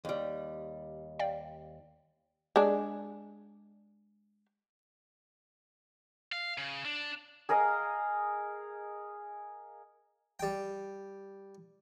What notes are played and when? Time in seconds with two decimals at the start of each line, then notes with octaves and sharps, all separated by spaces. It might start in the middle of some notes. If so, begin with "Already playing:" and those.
0.05 D#2 G3
1.19 D5 F5 G5
2.56 G#3 D4
6.32 F5
6.58 C#3
6.85 D4
7.49 G#4 A#4 D#5 F5
10.40 G3 G5